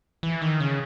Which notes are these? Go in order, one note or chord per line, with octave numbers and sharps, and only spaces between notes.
E3
D#3
C#3